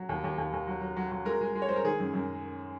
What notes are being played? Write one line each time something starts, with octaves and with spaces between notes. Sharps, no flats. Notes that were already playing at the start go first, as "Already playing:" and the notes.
Already playing: F#3
D#2
D#2
D#2
D#2
F#3
F#3
F#3
F#3
G#3 A#4
G#3
G#3
C#5
G#3 C5
A#4
D#3 G#4
F#2
F#2